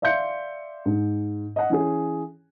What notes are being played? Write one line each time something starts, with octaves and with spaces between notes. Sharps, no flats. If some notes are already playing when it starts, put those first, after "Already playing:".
D5 E5 F5 C6 G6 C#7
G#2
D#5 F#5
E3 C#4 G#4